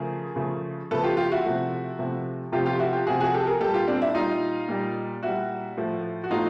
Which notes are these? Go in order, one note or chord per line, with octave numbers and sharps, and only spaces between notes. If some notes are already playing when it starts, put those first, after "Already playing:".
Already playing: C#3 F3 A3 G#4 A#4
C#3 F3 A3
C#3 F3 A3 A4 B4
F4 G4
F4 G4
E4 F#4
C3 F3 A3
C3 F3 A3
C3 F3 A3 F4 G4
F4 G4
E4 F#4
F4 G4
C3 F3 A3 F#4 G#4
F#4 G#4
G4 A4
G#4 A#4
A#2 G4 A4
G3
F4 G4
C4 D4
D4 E4
A#2 G3 D#4 F4
A#2 G3
A#2 G3 E4 F#4
A2 F3 A3
F#4
A2 F3 A3 D#4 F4